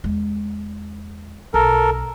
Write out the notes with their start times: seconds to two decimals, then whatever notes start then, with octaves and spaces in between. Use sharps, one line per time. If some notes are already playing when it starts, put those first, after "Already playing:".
0.04 E2 G#3
1.54 B1 A4 A#4